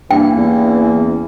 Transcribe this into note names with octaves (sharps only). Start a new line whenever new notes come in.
G2 E3 A#3 C#4 G5
E2